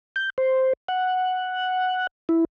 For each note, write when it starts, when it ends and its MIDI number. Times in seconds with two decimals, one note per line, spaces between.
0.16 0.30 91
0.38 0.73 72
0.89 2.07 78
2.29 2.45 64